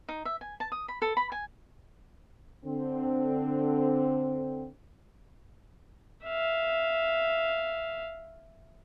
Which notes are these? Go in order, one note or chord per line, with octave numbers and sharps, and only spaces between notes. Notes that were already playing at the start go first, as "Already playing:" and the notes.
D#4
E5
G#5
A5
D#6
B5
A4
B5
G#5
D3 C4
E5 F5